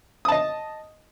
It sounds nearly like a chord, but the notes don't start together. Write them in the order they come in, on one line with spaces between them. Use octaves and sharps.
D#6 A5 D#5